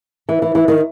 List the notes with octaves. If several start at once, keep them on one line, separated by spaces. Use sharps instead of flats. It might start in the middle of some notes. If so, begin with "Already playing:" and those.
E3
E3
E3
D#3